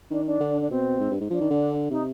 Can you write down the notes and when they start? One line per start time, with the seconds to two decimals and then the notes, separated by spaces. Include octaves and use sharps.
0.10 D#3 D4
0.26 D4
0.40 D3
0.61 D4
0.70 B2 C4
1.00 G#2
1.11 G2
1.21 G#2
1.30 F3 D4
1.41 D#3
1.50 D3
1.90 C3 D#4